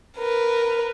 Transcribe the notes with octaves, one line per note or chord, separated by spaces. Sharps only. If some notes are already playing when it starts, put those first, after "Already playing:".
A#4 B4